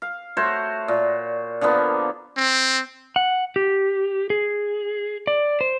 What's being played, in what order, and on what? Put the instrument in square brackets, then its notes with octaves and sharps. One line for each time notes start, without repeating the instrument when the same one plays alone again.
[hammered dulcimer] F5
A3 F#4 C5 C#5
A#2
D3 F3 A#3 B3
[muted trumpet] C4
[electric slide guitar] F#5
G4
G#4
D5
C5